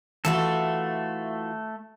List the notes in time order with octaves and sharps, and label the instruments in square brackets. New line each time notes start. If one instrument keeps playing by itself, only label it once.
[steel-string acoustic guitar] E3 F4 F#4 [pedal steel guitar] A3 A4